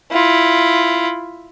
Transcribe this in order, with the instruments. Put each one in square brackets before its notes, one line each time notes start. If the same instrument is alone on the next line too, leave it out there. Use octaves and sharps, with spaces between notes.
[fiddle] E4 F4